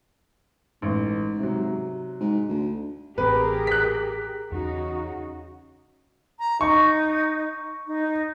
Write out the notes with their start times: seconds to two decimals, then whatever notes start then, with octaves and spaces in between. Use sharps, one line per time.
0.82 A1 G#2
1.39 C3 F#3
2.21 G#2
2.49 D2
3.18 A1 C4 G4 G#4 A#4 B4
3.67 F#6 B6
4.52 E2 C#3 D#4 F#4
6.39 A#5
6.61 D#4 C#6
7.87 D#4